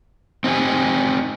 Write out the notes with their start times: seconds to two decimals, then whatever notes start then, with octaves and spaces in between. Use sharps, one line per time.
0.44 C4 D#4 G4 G#5